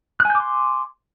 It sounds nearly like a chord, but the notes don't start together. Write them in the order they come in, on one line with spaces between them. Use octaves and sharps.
F#6 G#5 G6 D6 C6